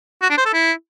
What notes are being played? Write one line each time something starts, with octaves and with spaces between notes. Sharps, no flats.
F#4
D4
C5
A4
E4